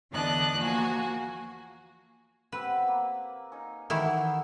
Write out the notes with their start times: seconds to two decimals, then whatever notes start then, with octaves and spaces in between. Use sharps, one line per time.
0.12 E2 D3 D4 D#5 A5 F#6
0.57 F3 A#3 F#4 G#5
2.52 B3 C4 G4 B4
2.88 A#3
3.52 C#4 D#4
3.90 D#3 E3 E4 F#4 A4